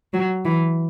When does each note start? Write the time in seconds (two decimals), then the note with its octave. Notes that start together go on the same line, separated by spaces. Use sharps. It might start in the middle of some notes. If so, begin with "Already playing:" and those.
0.13 F#3
0.45 E3